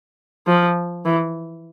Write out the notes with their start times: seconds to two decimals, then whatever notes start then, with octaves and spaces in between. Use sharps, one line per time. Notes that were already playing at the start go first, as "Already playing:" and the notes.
0.47 F3
1.05 E3